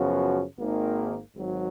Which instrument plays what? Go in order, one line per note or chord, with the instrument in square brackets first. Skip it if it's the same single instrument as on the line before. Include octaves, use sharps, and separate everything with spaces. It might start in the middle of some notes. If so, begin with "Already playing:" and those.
Already playing: [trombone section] F#2 C#3 F3 B3 F#4
G#1 G#2 D#3 A#3
G#1 G#2 F#3